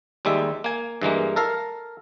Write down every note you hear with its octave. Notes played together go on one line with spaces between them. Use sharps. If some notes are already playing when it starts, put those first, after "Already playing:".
D#2 G3 G#3 E5
A#3 G#5
G2 E3 G#3 A#3
A4 A#4 F5